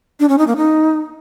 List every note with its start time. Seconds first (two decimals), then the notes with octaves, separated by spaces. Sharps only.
0.20 D4
0.29 C#4
0.38 D#4
0.47 A#3
0.57 D#4